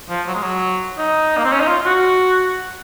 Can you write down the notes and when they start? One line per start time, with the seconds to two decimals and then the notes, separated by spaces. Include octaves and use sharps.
0.09 F3
0.28 F#3
0.35 G#3
0.43 F#3
0.98 D#4
1.38 A#3
1.45 C4
1.53 C#4
1.61 D#4
1.68 F4
1.86 F#4